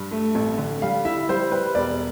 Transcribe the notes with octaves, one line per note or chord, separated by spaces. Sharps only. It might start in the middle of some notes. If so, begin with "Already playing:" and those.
Already playing: G2
A3
A1
D3
G3 F5
E4 E5
G3 C5
G3 B4
E1 D5